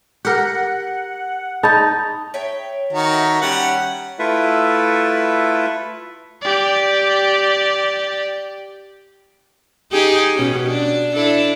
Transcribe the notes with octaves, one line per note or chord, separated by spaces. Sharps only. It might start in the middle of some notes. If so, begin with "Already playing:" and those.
G4 A#4 F#5
D#4 G#4 A5 B5 G6
C#5 E5 G5
D#3 F#4 A#5
A4 E5 A5
G3 C#4 F#5
A3 E4 F4 A4 B4 E5
G4 D5
D#4 G4 G#4
B2 C#4
D4
D4 E4 A4